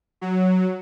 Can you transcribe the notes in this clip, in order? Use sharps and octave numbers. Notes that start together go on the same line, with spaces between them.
F#3